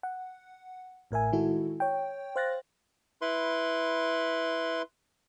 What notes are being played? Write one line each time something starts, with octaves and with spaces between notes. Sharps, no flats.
F#5
A1 A2 A#4 E5 G#5
D#3 G#3 E4 F#4 A4
C#5 G5
C5 F5 F#6 A6 A#6
E4 B4 C6